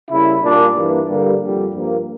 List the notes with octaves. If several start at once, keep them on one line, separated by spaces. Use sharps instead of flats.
C#3 G3 A#3 E4
A#2 G3 A#3 D4
G2 E3 A#3
G2 D3 G3 A#3
F2 D3 G3
G2 F3 A#3